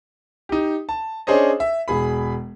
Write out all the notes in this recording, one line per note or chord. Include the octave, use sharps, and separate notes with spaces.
D#4 G4
A5
C#4 D4 G#4 C5 C#5 D#5
E5
E1 G#4 B5